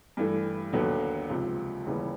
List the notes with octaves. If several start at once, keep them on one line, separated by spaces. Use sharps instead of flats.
G2 E3 A3
D#2 D3 F#3 B3
C#2 C3 F3
D#2 C#3 E3 G3 B3